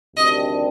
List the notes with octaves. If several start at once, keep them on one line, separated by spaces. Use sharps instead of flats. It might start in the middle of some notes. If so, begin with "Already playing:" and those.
D2 C3 D#3 G3 D4 D#5